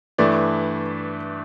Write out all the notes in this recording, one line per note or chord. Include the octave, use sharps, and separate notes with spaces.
G2 E3 A3 D5